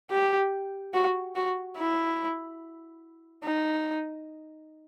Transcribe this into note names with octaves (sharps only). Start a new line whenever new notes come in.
G4
F#4
F#4
E4
D#4